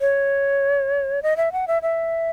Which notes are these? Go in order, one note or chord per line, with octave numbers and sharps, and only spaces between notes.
C#5
D#5
E5
F#5
E5
E5